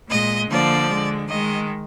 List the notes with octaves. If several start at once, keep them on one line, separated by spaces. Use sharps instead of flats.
A#2 G#3 D#5
D3 F3 A#3 D5
D3 G#3
D#3 G#3 D#5